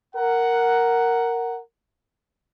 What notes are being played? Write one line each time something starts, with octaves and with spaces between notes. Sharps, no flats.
A#4 F#5